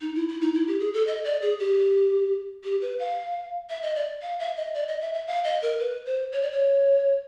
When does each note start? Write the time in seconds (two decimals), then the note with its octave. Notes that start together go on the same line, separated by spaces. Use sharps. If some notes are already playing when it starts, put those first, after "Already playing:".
0.01 D#4
0.15 E4
0.28 E4
0.41 D#4
0.54 E4
0.67 G4
0.80 G#4
0.93 A4
1.07 D#5
1.24 D5
1.42 G#4
1.59 G4
2.64 G4
2.81 B4
2.99 F5
3.70 E5
3.82 D#5
3.96 D5
4.22 F5
4.40 E5
4.57 D#5
4.74 D5
4.88 D#5
5.01 E5
5.14 E5
5.27 F5
5.44 D#5
5.62 A#4
5.79 B4
6.06 C5
6.32 C#5
6.42 D5
6.52 C#5